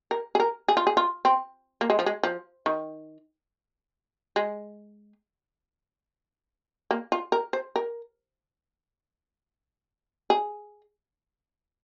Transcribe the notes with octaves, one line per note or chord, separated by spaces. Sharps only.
A#4
G#4
A#4
G#4
F4
G#4
F4
C4
A#3
G#3
F3
G#3
F3
D#3
G#3
A#3
F4
A#4
C5
A#4
G#4